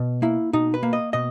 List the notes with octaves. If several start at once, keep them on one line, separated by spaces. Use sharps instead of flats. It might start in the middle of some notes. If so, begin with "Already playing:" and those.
Already playing: B2
A#3 E4
B2 D#4
B4
A#3
D#5
B2 D#5